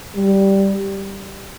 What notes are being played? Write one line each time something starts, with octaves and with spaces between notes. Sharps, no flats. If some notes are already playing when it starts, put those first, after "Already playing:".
G3